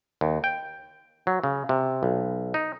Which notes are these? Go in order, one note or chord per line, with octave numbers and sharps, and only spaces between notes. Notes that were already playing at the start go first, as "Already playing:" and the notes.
D#2
G5
F#3
C#3
C3
B1
D#4